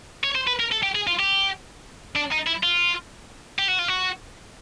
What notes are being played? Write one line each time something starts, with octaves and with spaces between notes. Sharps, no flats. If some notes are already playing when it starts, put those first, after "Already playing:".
C#5
C5
B4
A#4
A4
G4
G#4
F4
G4
D4
D#4
E4
F4
G4
F#4
F4
F#4